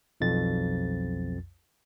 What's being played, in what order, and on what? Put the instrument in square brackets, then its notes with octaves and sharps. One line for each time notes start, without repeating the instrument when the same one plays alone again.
[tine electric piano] B1 F2 A6